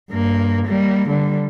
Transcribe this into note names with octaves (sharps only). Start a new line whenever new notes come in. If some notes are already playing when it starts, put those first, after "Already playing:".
G2 A#3
G3 A#3
D3 G3